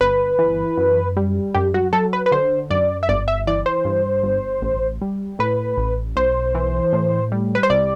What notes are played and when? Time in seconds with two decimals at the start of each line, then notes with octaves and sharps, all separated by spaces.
0.01 G1 B4
0.39 E3
0.77 F#2
1.17 G3
1.54 F#2 G4
1.74 F#4
1.93 F#3 A4
2.13 B4
2.26 B4
2.32 D3 C5
2.70 F#2 D5
3.03 E5
3.09 G1 D5
3.28 E5
3.47 E3 D5
3.66 C5
3.85 G2
4.23 G1
4.62 A1
5.02 G3
5.39 A2 B4
5.78 A1
6.16 B1 C5
6.55 E3
6.93 A2
7.32 G3
7.55 B4
7.63 C5
7.70 C2 D5